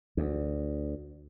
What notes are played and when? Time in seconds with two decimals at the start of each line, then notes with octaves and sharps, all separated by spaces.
0.17 D2